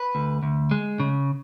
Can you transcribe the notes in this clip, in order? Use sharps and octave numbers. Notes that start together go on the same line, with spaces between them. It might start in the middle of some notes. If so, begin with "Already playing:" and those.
Already playing: B4
D2
D2
G#3
C#3